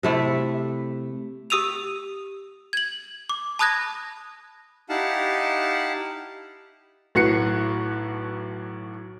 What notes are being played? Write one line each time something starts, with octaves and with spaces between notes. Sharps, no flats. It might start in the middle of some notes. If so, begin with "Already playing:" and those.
C3 A3 E4
G4 D#6 E6 D#7 F7
G#6 F#7
D6
A5 B5 D#6 F#6 G#6 A#6
D#4 E4 G4 F5 F#5 A5
B1 A2 F#4 B4 C7 C#7